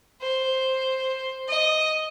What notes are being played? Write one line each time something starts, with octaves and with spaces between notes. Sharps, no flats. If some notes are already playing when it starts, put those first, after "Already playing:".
C5
D#5